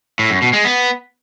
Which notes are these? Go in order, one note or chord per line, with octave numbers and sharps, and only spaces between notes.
A2
F#2
B2
G#3
B3